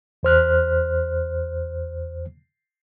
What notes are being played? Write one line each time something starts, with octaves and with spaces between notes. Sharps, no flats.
E2 C5 F6 F#6